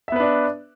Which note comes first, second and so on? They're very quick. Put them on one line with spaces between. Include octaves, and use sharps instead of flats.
E5 B3 B4 D4